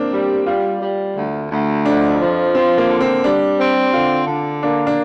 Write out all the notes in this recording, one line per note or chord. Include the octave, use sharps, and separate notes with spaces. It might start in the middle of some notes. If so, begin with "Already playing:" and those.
Already playing: A#3 C4 D4
G3
G3 F4
G3
D2
D2
F2 D4
F3
C4 F4
A#3
D3
C4
G3 D4
C4
D3 F4
D3
A#3 D4
D4